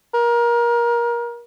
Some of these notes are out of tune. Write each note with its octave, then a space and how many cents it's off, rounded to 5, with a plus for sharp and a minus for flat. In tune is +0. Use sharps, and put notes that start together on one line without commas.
A#4 +25